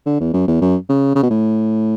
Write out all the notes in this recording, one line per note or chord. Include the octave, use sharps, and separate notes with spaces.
D3
E2
F#2
E2
F#2
C#3
C#3
B2
A2